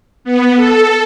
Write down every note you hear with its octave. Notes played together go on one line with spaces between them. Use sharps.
B3
A4